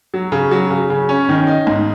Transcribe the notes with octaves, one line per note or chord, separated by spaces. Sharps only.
F#3
C#3
F#3
C#3
C#3
C#4
D#3
D#4
G#2